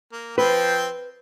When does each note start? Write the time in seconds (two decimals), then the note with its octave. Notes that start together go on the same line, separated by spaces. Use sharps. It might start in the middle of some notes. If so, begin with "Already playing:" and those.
0.12 A#3
0.38 F3 C4 B4 G5